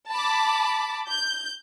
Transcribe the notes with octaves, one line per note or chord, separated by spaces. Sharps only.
A5 B5 D6
G6